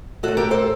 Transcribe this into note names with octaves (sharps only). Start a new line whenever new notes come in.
A2 A3 F#4 A4
G4 A#4
A4 C5